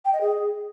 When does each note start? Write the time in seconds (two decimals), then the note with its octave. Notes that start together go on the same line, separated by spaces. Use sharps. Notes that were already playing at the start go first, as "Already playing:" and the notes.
0.05 G5
0.13 D#5
0.21 G#4